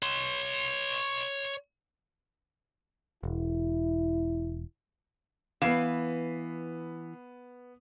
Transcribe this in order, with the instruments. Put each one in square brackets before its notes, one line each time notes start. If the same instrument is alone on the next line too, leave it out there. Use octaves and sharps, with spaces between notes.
[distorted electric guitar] C#5 C6
[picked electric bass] E1 [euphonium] E4
[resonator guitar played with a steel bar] E3 F5 [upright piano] B3 C7 E7